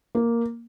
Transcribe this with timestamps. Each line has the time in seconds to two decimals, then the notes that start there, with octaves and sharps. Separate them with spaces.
0.15 A#3